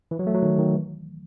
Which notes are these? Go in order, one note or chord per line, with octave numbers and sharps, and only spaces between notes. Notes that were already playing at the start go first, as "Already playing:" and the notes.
E3
F#3
A3
F#3
D#3
D#3
E3